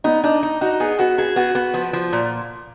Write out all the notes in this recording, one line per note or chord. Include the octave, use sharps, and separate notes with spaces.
B3 D#4
D4 D#4
D#4
D#4 F#4
B3 G#4
B3 F#4
F#4 G#4
B3 F#4
B3
F3
F3
A#2